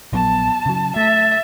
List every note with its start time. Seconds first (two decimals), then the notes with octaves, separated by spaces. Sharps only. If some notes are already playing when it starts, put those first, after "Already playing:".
0.13 A#1 F#3 B3 A5
0.66 C#3 F#3
0.96 A3 E5 A6